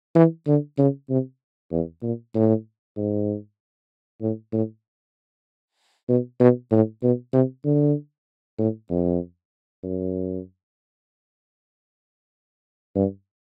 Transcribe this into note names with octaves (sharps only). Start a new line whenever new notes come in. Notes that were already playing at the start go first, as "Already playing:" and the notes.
E3
D3
C#3
C3
E2
A#2
A2
G#2
A2
A2
B2
B2
A2
B2
C3
D3
A2
F2
F#2
G2